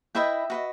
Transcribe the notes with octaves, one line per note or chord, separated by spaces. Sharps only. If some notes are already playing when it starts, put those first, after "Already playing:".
E4 B4 D#5 E5 G5
F#4 B4 D#5